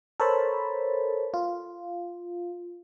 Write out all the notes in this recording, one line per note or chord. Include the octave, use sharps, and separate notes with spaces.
A4 A#4 C5 C#5 A5 B5
F4